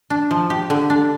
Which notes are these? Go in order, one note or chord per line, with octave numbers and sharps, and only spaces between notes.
D4
F3
G4
D3
D4